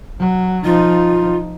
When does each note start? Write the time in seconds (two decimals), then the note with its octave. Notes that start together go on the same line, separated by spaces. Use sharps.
0.20 F#3
0.65 F3 D#4 F4